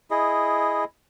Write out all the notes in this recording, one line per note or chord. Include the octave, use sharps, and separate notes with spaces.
E4 G#4 D#5